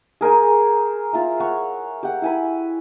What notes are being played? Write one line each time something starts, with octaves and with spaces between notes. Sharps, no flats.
G#4 A#4 C5 G#5
F4 E5 A#5
C#5 F#5 C#6
G4 F#5
E4 G#5 B5